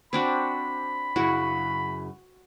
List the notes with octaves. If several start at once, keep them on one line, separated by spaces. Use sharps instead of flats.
C4 D4 F#4 B5
F#2 C#3 E4 F#4